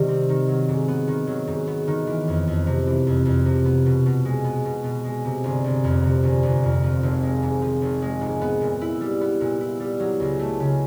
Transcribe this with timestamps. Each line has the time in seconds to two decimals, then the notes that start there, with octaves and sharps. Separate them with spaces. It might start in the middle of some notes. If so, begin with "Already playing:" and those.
Already playing: C3 D#3 G3
0.08 C4
0.29 D#3
0.48 F#3
0.68 G#2
0.88 B3
1.07 D#3
1.27 F#3
1.47 G#2
1.67 B3
1.87 D#3
2.07 E3
2.28 F2
2.47 F2
2.67 C3
2.87 E3
3.07 F2
3.25 F2
3.45 C3
3.65 B3
3.86 B2
4.06 B2
4.25 G#3
4.44 B3
4.65 B2
4.84 B2
5.04 G#3
5.25 C3
5.44 G1
5.64 G1
5.84 F2
6.04 C3
6.23 G1
6.43 G1
6.63 F2
6.83 F3
7.03 G#1
7.23 G#3
7.43 G#2
7.62 F3
7.82 G#1
8.02 G#3
8.21 G#2
8.41 B3
8.61 A#2
8.81 E4
9.01 G3
9.21 B3
9.41 A#2
9.61 E4
9.80 G3
10.00 F#3
10.20 C#2
10.39 A3
10.60 C#3